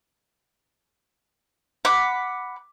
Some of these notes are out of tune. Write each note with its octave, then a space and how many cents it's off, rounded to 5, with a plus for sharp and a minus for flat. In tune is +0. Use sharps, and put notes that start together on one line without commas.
F#5 +0 B5 +0 D6 +0